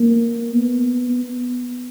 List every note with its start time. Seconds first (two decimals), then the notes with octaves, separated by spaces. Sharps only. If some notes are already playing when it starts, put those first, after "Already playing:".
Already playing: A#3
0.53 B3
1.10 B3